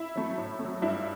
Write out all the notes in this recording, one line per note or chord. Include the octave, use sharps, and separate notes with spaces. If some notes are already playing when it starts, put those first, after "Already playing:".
Already playing: E4
F#3 A3
A2
A3
F#3
G2 E4